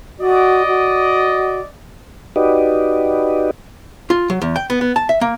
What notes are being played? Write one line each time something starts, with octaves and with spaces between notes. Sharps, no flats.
F#4 D5 D#5
F#4
D#4 F#4 G4 B4 D5 D#5
F4
F#3
E2
G5
B3
B3
A5
E5
A#3